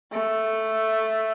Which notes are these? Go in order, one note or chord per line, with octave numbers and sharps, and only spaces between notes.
A3